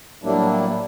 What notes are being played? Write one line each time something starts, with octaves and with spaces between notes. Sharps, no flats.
A2 F#3 G3 A#3 D4 E4